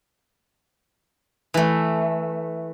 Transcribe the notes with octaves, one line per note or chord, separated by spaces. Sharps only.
E3 A3